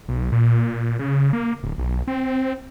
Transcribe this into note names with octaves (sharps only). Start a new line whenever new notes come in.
B1
A#2
C#3
A#3
D1
B1
C4